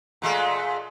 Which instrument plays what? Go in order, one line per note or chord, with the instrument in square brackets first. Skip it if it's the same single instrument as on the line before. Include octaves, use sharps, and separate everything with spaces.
[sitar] A#2 G#3 A3